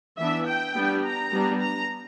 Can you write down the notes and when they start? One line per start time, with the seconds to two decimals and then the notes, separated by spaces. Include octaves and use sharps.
0.18 E3 B3 D4 E5
0.48 G5
0.75 G3 B3 D4
1.04 A#5
1.33 G3 B3 D4
1.62 A#5